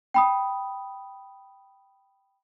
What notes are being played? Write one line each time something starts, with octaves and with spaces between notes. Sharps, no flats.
G5 B5 D#6